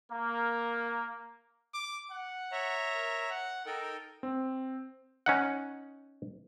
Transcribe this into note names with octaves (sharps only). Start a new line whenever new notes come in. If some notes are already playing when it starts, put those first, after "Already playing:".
A#3
D6
F#5
C#5 E5 A#5
A#4
F#5
D#4 A4 A#4 G5
C4
C#4 D#4 F#5